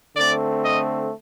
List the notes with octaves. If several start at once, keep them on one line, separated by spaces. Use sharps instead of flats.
D3 A3 C4 D5
D#5